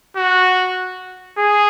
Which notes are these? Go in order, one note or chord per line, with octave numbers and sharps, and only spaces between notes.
F#4
G#4